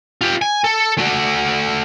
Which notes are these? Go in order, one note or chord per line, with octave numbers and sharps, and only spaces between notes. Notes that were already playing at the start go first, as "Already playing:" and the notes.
F4 G4
G#5
A4
A3 F#4